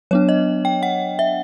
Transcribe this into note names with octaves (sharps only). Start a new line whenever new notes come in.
F#3 B3 D4 C#5
D#5
G5
F#5
E5